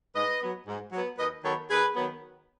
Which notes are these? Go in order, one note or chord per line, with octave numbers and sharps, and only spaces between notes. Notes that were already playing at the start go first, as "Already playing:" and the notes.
G#2 B4 D#5
F#3 B3
G#2
F#3 B3
D#2 B4 D#5
D#3 F#3 B3 A4 C#5
D#2 G#4 B4
D#3 F#3 B3